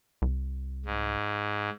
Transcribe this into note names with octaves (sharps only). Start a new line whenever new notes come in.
C2
G#2